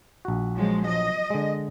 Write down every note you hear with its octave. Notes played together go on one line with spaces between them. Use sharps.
A#1 F#4
F3 F#3 G#3
D#5
D3 G#3